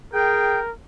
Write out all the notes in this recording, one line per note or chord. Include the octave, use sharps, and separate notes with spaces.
G#4 A#4 G5